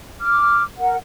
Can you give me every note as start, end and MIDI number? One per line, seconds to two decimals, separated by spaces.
0.20 0.63 86
0.20 0.63 89
0.78 0.96 70
0.78 0.96 78